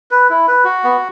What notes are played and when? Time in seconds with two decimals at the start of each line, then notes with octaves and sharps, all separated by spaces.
0.11 B4
0.30 E4
0.48 B4
0.65 F#4
0.84 B3